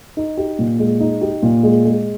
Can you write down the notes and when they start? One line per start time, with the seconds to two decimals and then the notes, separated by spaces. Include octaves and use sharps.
0.17 D#4
0.37 G4
0.59 A#2
0.79 G#3
1.00 D#4
1.21 G4
1.43 A#2
1.63 G#3
1.85 G#3